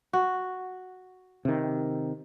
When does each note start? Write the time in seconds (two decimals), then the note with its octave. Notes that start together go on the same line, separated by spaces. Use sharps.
0.13 F#4
1.45 C3 D#3